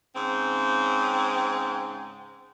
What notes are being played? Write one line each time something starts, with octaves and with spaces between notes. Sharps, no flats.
G#2 C#3 C4